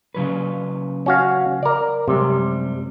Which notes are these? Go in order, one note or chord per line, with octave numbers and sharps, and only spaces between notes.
C#3 F#3 B4
C#4 F#4 F5
A#4 D5
F#2 C3 G3 G#3